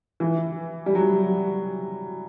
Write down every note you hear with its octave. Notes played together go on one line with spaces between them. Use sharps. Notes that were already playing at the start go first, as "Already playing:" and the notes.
E3
G3
F#3